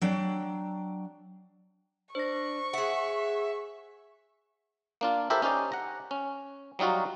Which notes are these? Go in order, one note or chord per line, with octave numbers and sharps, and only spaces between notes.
F#3 D4 G5
D4 C5 C#6 A#6
G#4 E5 F#5
A#3 D4 F4
E4 G4 A4 A#4 C5 E5
C#4 D#4 G4 C5 D5
F#5 A#5
C#4
F#3 G3 D#4 F4 F#4